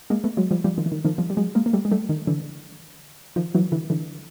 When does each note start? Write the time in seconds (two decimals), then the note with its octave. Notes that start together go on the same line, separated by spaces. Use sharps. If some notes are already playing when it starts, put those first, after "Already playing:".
0.10 G#3 A#3
0.24 A3 B3
0.37 F#3 G#3
0.51 F3 G3
0.64 F3 G3
0.78 D#3 F3
0.86 E3
0.92 D#3
1.05 D#3 F3
1.18 F3 G3
1.30 G3
1.37 F#3 G#3
1.55 G#3 A#3
1.66 A#3
1.73 G3 A3
1.85 G#3
1.91 G3 A3
2.09 D#3
2.27 D3 E3
3.36 D#3 F3
3.55 E3 F#3
3.72 D3 E3
3.90 D3 E3